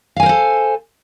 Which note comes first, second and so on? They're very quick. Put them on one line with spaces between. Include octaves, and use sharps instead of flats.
F5 G#5 A#4 C5 A4